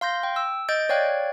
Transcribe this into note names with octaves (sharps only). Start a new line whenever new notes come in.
F5 C6 G6 A#6
G5
E6
D#5 G6 A6 D7
C#5 D5 F5 G5 F#6 G#6